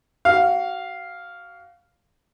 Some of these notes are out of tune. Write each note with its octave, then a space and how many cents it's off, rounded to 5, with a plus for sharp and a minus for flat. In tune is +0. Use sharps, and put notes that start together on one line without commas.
F#4 +30 F5 +0